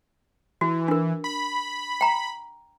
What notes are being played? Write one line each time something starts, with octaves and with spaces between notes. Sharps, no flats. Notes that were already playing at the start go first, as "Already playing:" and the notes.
E3 F#4
D4 A#4
B5
G5 A#5